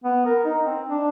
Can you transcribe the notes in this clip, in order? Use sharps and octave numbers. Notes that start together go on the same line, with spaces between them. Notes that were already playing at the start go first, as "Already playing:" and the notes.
B3
A#4
D#4
C4
D4